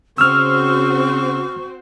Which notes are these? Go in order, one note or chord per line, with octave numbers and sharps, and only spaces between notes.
C#3 C4 F#4 C5 C#6 E6 F6